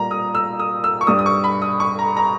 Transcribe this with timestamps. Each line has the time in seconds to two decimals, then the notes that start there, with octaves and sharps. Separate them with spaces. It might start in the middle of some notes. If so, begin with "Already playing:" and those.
Already playing: A#2 G3 A#5
0.11 D#6
0.35 E6
0.60 D#6
0.84 E6
1.01 C#6
1.07 G2 G3 D#6
1.19 D#6
1.26 C#6
1.44 B5
1.62 D#6
1.80 C#6
1.99 A#5
2.17 A#5